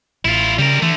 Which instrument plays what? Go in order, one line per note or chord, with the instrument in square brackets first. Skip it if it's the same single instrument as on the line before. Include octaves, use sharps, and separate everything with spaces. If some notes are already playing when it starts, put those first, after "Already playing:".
[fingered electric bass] A1 [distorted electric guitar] E4 F4
[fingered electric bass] C#3 [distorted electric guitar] G3 A#4
[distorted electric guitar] D3 A3 [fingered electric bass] E3